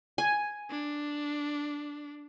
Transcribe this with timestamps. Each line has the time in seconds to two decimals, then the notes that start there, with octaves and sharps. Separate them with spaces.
0.18 G#5
0.70 D4